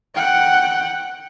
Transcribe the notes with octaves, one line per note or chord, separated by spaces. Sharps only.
F#5 G5